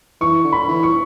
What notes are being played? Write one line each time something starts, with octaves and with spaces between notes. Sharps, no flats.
E3 C#6
D3
B5
E3
C#6